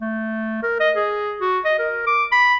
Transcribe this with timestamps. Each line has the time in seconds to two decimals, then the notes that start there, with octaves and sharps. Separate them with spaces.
0.01 A3
0.63 A#4
0.80 D#5
0.96 G#4
1.41 F#4
1.65 D#5
1.79 A#4
2.07 D6
2.32 B5